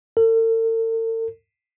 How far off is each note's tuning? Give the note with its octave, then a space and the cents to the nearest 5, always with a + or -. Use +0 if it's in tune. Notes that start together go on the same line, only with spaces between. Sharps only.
A4 +45